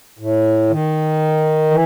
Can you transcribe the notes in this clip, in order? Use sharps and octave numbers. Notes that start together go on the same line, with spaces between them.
A2
D#3
E3